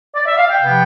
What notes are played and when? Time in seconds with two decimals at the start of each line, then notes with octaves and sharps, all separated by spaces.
0.15 D5
0.26 E5
0.37 F5
0.49 G5
0.60 C3 F3 B3